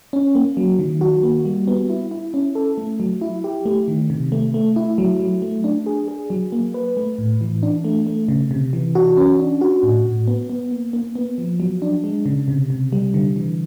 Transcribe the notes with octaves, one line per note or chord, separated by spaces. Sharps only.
C#4
A#3
F#3
D#3
F#4
A#3
G3
B3
E4
E4
C#4
A4
A3
F#3
E4
G4
A3
D#3
C3
A3
A3
E4
F#3
F#3
A3
D4
G#4
G#4
F#3
A#3
B4
A3
A2
E3
D4
A3
A3
C#3
C3
E3
F#4
C#4
D4
F#4
A2
A2
B3
B3
A#3
A#3
B3
F3
F#3
D4
G#3
C#3
C3
C3
G3
D3
E3